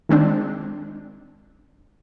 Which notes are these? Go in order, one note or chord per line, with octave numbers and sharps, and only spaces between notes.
D#3 G#3 C4 D4